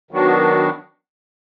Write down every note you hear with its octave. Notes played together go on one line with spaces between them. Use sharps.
D#3 F#3 B3 D4 F#4